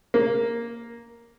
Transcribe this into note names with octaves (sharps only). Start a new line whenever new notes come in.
A#3